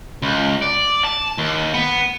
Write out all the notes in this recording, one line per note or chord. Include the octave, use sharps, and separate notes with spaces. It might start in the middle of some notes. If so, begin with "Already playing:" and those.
C#2
D5
A5
D#2
B3